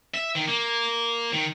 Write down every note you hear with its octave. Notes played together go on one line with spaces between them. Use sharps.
E5
D#3
A#3
D#3